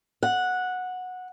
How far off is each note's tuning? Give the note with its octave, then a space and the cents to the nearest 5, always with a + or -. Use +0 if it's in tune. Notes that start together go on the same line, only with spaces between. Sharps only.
F#5 -10